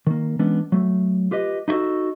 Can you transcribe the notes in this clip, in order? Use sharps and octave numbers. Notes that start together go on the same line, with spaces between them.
D#3 A#3
E3 G#3 B3 C#4 D4
F#3 A3
F4 G4 B4 D#5
D#4 E4 F#4 A4 D#5